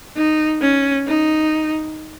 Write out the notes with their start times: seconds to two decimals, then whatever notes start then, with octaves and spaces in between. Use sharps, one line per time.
0.16 D#4
0.62 C#4
1.07 D#4